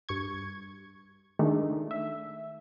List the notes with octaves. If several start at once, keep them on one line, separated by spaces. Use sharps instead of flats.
G2 C#6 G#6
D#3 G#3 A3 D4 D#4
E5